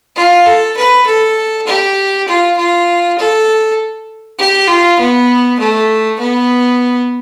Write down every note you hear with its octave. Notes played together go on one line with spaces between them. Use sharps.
F4
A4
B4
A4
G4
F4
F4
A4
G4
F4
B3
A3
B3